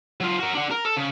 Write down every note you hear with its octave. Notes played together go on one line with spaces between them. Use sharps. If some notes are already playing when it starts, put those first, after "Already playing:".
F#3 F4
F#4 A#4
D4 F#5
A#4
A4
C#3